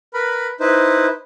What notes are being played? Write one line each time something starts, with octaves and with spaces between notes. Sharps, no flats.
A#4 B4 B5
D#4 E4 B4 C5